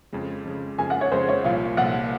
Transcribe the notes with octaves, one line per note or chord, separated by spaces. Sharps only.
F2 C#3 G#3
F2 C#3 G#3
F2 C#3 G#3 G#5
F#5
C#5
F2 C#3 G#3 C5
C#5
C2 A#2 F3 F5
C2 A#2 F3 F#5